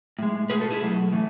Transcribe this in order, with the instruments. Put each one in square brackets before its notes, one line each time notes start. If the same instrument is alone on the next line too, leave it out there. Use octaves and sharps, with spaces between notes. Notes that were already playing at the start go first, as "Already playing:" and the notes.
[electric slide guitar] A2 G#3
B2 A3 G#4 B4
F#4 A4
E4 G#4
B2 F#3 A3
A2 E3 A3